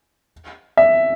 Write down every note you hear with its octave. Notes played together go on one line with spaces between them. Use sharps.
E5